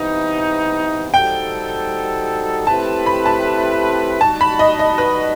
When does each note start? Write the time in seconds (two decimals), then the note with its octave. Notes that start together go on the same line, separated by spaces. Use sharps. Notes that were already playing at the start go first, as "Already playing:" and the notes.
Already playing: C3 E3 B3 D#4
1.14 G3 D#4 F#4 A4 C5 G5
2.67 A3 C4 E4 G4 B4 A5
3.06 B5
3.26 A5
4.21 G3 D#4 F#4 A5
4.41 B5
4.59 D#5
4.79 D#5
4.98 B4